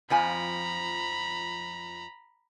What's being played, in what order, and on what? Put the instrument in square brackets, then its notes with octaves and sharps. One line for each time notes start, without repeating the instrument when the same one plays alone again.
[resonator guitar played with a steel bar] F2 F3 G#5 [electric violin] A#5 B5